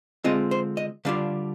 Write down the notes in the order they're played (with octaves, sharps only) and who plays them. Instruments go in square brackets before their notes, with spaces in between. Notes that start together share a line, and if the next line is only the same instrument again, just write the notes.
[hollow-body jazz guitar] D3 G#3 C4 F4 D#5
C5
D#5
D3 G3 D4 F4 F5